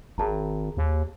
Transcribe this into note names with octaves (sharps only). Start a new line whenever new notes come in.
G#1 G#4 A5 A#5
D#2